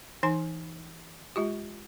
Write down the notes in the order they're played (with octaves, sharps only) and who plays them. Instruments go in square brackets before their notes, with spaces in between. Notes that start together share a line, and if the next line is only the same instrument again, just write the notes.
[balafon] E3 D#4 G#5 C6
G#3 F4 G4